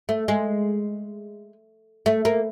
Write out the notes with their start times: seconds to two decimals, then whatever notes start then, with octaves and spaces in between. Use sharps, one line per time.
0.09 A3
0.28 G#3
2.06 A3
2.25 A#3